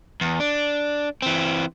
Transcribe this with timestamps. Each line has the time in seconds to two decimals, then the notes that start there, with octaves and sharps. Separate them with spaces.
0.21 E2
0.40 D4
1.22 E3 C4